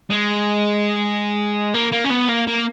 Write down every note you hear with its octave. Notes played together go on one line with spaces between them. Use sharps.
G#3
A#3
A#3
C#4
B3
A#3
A#3